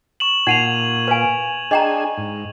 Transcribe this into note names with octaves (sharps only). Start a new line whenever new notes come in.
C#6 E7 F#7
A#2 D#4 F#5 G#6 D#7 F7
B4 F5 G#5
D4 G#4 D#5 G5 G#5 A#5
G#2